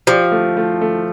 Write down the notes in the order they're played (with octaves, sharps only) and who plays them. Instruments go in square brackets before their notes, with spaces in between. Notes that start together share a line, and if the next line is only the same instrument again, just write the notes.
[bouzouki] F3 [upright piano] G4
[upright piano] A3
A3
A3